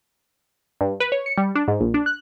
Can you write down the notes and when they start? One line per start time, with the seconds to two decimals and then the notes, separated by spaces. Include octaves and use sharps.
0.81 G2
1.00 B4
1.12 C#5
1.26 C#7
1.37 G3
1.55 D4
1.68 G#2
1.81 A#1
1.94 D4
2.06 F#6